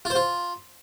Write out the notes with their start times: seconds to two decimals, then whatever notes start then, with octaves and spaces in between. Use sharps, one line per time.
0.05 F4
0.10 C5
0.15 F4